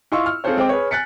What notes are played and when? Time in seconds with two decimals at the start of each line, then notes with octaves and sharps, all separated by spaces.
0.12 E4 F4 D#5 C6 C#6 E6
0.26 F6
0.44 C4 F4 G#4 A4 C5 C#5
0.56 G#3 C4 C5 G5 D6
0.69 G#4 B4 C#5
0.91 G#5 F#6 A6 B6 C#7